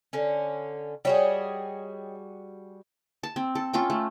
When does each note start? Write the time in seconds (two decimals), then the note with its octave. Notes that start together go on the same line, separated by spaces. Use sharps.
0.13 D3 C#4
1.05 G3 F#4 G#4 C#5 D#5 G5
3.23 A5
3.36 C4
3.55 A4
3.73 C#4 F4 A4 G5
3.90 A3